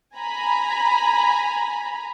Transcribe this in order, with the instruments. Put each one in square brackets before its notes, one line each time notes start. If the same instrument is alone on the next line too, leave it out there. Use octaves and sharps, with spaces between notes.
[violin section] G#5 A#5 B5